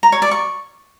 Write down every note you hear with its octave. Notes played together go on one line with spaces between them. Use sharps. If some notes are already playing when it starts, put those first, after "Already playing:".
A#5
C#5
D5
C#6